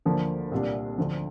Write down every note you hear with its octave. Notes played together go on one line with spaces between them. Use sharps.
D2 D3 F3 A#3 D4
C2 A#2 G3 D4
D2 D3 F3